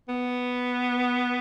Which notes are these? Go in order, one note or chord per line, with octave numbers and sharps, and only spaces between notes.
B3